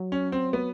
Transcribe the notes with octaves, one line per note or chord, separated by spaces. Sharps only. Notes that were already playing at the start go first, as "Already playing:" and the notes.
Already playing: F#3
C#4
C4
B3